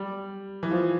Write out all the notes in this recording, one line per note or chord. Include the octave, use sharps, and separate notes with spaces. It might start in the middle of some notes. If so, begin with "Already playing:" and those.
Already playing: G3
E3
F3